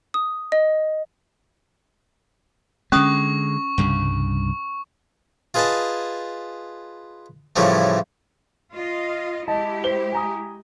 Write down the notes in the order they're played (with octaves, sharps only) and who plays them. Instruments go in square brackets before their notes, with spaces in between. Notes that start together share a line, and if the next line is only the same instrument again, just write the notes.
[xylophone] D#6
D#5
[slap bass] D3 G#3 [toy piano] C#4 D#6 [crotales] C#6
[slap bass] C2 G2 C#3
[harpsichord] F4 G#4 B4 D#5 G#5 A5
A2 C#3 E3 F3 G3 A3
[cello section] F4 D#5
[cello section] G#3 E4 G4 [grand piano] D#5 A5
[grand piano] C5 G7
G#5 A#5 D#6